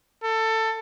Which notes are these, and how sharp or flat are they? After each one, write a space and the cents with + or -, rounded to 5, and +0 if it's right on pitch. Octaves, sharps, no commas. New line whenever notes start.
A4 +20